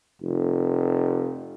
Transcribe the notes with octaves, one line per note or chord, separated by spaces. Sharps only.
F1